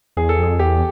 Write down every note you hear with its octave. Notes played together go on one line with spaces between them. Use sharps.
E2 G#4
A4
F2 G#4
E2 G4